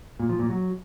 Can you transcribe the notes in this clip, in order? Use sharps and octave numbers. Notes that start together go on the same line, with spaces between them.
A#2
F3
A#2
F#3